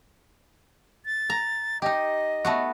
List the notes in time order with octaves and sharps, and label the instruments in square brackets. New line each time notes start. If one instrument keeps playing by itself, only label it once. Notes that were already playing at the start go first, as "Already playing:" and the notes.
[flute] A6
[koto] A#5
[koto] D#4 G4 [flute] D#5
[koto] A3 B3 F#4